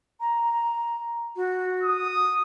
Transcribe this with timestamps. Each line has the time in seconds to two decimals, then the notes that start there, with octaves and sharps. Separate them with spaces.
0.20 A#5
1.35 F#4
1.83 D#6